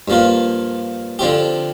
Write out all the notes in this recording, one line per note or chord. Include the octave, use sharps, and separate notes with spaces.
G2 F3 A#3 F4
D3 F3 C4 G4